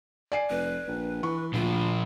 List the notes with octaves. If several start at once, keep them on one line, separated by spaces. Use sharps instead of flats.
D5 G#5 C7
F1 B4
A#1
E3 C#6
D2 A#2 F3 F4